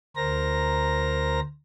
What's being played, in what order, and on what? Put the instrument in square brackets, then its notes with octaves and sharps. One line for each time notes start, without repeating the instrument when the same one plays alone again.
[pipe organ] D2 A#4 C5 A#5 A#6